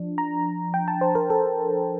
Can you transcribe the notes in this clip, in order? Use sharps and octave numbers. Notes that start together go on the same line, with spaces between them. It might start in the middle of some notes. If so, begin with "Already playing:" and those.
Already playing: F3 D4
A#5
G5
A5
C5
A#4
A4